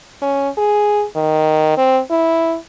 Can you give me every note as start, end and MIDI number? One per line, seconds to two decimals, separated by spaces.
0.22 0.49 61
0.58 1.04 68
1.16 1.74 51
1.77 2.00 60
2.11 2.56 64